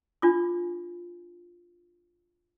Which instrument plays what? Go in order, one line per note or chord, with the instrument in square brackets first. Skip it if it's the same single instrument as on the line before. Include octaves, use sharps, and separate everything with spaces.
[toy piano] D4 F4 D6